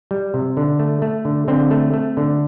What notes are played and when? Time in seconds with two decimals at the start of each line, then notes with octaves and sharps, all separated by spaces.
0.11 G3
0.34 C3
0.57 D3
0.79 A3
1.02 A3
1.25 D3
1.48 D3 C4
1.71 A3
1.94 A3
2.17 D3